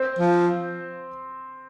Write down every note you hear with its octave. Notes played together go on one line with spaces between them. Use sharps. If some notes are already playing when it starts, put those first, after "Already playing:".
Already playing: C4 C5
F3